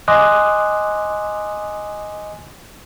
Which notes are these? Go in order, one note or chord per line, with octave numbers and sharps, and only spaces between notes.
D#5 G#5 C6 D6 D#6 F#6